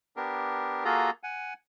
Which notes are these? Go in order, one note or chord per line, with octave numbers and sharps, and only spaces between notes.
B3 D4 G4 A#4
A#3 F4 F#4 G#4 A4 A#5
F#5 G#5